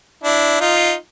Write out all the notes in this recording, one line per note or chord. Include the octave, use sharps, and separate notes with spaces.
D4 E4
D#4 F4